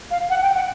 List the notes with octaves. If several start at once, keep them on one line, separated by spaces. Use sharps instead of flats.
F5
F#5
G5
F#5